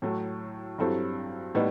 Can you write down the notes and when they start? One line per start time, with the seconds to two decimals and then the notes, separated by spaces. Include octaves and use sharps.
0.02 A2 F#3 A3
0.78 G2 F#3 C4 E4 A4
1.55 A2 G3 B3 D#4